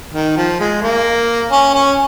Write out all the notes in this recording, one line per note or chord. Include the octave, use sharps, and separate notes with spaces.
D#3
F3
G#3
A#3
C#4
C#4